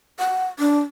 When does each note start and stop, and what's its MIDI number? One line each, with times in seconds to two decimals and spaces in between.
0.19 0.45 78
0.59 0.80 62